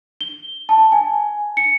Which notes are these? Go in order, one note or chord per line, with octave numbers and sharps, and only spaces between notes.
G7
A5
G#5
C#7